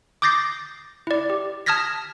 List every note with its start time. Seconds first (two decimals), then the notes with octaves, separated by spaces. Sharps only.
0.22 D6 D#6 G6 A6 A#6 C7
1.07 E4 D5
1.30 G4
1.66 A5 D#6 F6 G#6 A#6 B6